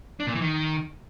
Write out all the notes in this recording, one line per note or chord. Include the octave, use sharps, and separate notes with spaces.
D4
A#2
E3
D#3